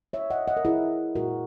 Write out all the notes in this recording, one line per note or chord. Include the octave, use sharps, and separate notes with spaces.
C#5 E5
D#5 F#5
D#5 F#5
A#4
E4 G#4
A#2 G#3 F#4 A#4